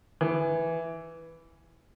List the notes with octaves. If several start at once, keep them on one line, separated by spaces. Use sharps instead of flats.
E3